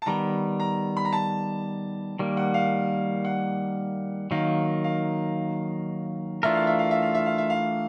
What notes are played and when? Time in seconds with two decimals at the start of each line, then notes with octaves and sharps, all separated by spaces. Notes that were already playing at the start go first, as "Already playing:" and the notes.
0.02 A5
0.06 D#3 G3 B3 A#5
0.60 A#5
0.97 B5
1.05 A#5
1.13 A5
2.19 D#3 G3 A#3
2.37 F#5
2.54 F5
3.25 F#5
4.31 D#3 F#3 A#3 D#4 F5
4.84 F5
6.43 E3 A3 D4 F4 A#4 E5
6.55 F5
6.67 E5
6.79 F5
6.91 E5
7.02 F5
7.15 E5
7.26 F5
7.38 E5
7.50 F5